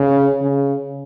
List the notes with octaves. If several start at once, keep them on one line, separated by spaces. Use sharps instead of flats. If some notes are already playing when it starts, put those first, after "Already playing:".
Already playing: C#3
C#3